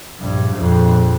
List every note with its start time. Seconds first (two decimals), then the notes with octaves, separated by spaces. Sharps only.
0.20 A#1 G2
0.55 A#1 F2